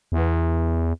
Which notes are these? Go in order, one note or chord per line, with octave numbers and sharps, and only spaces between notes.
E2